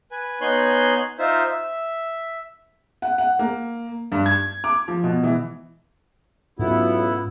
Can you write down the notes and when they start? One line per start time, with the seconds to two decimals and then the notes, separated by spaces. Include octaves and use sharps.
0.11 B4 G#5
0.41 B3 D#4 C#5 G#5 C6 F#6
1.19 D#4 F4 C5 E5
1.49 E5
3.02 F#5
3.18 F#5
3.39 A#3
4.12 G2
4.26 G#6
4.64 D6
4.88 F3
5.04 B2
5.23 E3
6.59 B1 G#2 B3 C#4 E4 F4